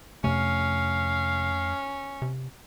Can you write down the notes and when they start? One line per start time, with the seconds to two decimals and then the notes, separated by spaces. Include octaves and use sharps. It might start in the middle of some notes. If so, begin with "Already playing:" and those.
0.24 F2 C3 A3 C#4 F5
2.22 C3